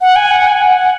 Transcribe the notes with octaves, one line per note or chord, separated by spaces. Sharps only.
F#5
G#5
F#5
G#5
F#5
F#5